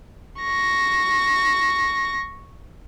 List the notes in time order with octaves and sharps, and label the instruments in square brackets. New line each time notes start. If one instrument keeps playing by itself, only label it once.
[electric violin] C#6 A#6